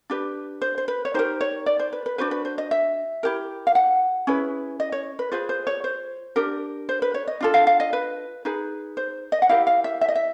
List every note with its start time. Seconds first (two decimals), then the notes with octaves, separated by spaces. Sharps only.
0.10 D4 G4 B4
0.62 C5
0.78 C5
0.88 B4
1.05 C#5
1.14 D#4 G4 A#4 C5
1.41 C#5
1.66 D5
1.79 C5
1.93 B4
2.06 B4
2.18 D4 F#4 B4 C5
2.31 B4
2.45 C5
2.58 D#5
2.71 E5
3.23 E4 G4 A#4
3.67 F5
3.75 F#5
4.27 C#4 E4 G#4 B4
4.80 D#5
4.92 C#5
5.19 B4
5.32 F4 G#4 B4 C5
5.49 C5
5.67 C#5
5.84 C5
6.36 D4 G4 A#4
6.89 C5
7.02 B4
7.14 C#5
7.28 D#5
7.41 D4 F4 A4
7.54 F5
7.67 F5
7.80 D#5
7.93 B4
8.45 D#4 G#4 B4
8.97 C5
9.32 D#5
9.42 F#5
9.49 E4 G4 A#4 F5
9.67 F5
9.84 E5
10.01 E5
10.08 D#5
10.15 E5